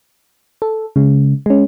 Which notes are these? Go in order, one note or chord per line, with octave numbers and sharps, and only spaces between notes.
A4
C#3 G#3
G#3 C#4